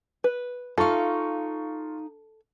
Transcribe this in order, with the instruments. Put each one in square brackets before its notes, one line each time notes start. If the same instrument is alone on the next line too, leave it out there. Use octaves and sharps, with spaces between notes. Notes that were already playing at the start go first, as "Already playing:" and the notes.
[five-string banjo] B4
[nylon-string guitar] D#4 F5 [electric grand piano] F4 C#6 [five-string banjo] A4